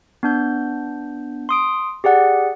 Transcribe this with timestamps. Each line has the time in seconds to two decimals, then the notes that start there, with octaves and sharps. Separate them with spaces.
0.23 B3 D4 G6
1.49 C6 D#6 D7
2.04 G4 G#4 D5 F#5